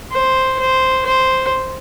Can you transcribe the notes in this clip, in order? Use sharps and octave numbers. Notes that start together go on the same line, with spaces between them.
C5
C5
C5